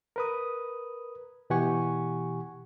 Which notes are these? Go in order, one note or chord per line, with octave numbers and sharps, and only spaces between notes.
A#4 B4 D#6
B2 E3 G4 F#5 G#5 C#6